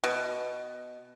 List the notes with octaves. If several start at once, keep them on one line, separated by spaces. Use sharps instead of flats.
B2